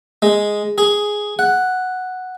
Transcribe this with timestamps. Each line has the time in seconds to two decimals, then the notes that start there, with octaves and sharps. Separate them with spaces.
0.22 G#3
0.78 G#4
1.39 F#5